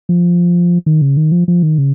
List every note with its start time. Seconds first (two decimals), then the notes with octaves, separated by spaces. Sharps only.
0.09 F3
0.86 D#3
1.02 C#3
1.17 D#3
1.32 F3
1.48 F3
1.63 D#3
1.78 C#3